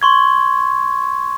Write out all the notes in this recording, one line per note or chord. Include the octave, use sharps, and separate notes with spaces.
C6 C#6 G#6